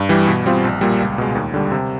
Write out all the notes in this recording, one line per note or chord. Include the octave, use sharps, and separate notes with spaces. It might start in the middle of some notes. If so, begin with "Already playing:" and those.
Already playing: G2
E3 G3
B2
G3 C4 F4
A#1
A#2 G3
C#2
B2 G#3
D#2
D3 G3
C3